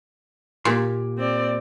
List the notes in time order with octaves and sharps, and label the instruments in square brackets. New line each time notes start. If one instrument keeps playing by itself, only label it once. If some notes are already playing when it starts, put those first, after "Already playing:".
[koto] A#2 [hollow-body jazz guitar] A#3 G4 C6
[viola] C4 D5